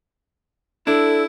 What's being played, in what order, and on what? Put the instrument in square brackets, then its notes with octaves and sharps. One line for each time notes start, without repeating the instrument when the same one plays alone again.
[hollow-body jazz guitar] D4 [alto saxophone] E4 [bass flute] A4